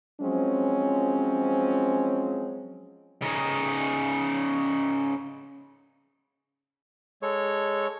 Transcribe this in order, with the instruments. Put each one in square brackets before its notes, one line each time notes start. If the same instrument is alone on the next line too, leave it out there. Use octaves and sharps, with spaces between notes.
[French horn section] F3 F#3 G#3 C4 C#4
[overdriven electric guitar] C#3 D#4
[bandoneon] G#3 A4 C#5 C#6